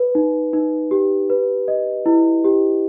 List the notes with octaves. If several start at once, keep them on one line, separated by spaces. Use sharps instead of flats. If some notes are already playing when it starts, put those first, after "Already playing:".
Already playing: B4
D#4
D#4
G4
B4
D#5
E4
G4